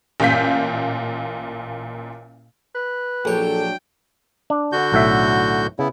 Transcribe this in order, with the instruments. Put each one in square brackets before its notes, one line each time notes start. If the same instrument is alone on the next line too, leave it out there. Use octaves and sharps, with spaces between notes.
[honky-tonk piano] A1 A#2 F5 G6 B6
[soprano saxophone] B4
[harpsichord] A#1 C#5 [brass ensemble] F#3 D4 G5 [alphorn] A4
[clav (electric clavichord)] D4
[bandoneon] D3 F#4 G6
[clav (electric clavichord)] B1 A2 E5
[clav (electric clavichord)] C#3 [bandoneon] B3 E4